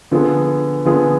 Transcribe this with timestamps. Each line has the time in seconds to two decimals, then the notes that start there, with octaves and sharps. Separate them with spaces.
0.11 D3 F3 B3 F4 G#4
0.85 D3 F3 B3 F4 G#4